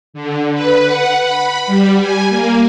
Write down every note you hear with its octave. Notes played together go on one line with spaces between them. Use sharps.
D3
B4
F#5
B5
G3
G#5
A#3